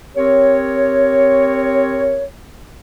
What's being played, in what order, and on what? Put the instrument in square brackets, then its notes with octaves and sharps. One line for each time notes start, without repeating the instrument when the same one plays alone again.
[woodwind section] C4 G4 A#4 C#5